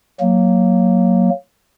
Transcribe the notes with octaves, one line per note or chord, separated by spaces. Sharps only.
F#3 A#3